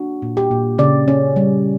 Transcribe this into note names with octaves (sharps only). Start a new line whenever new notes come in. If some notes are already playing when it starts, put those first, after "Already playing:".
Already playing: A#3 D4 F#4
A#2
G4
A#2
C#3 D5
C#4
G3